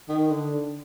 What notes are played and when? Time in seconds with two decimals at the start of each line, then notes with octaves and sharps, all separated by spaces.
0.09 D#3
0.30 D3